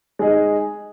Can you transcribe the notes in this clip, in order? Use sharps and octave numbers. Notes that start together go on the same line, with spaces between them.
G#3 D#4 G#4 D#5